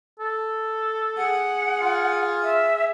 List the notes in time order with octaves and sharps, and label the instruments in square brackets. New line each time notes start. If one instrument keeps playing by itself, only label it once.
[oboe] A4
[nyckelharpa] G#4 [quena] F#5
[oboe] F4
[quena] E5